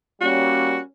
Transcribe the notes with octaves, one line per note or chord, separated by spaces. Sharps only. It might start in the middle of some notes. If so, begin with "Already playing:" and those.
G3 A#3 C#4 F#4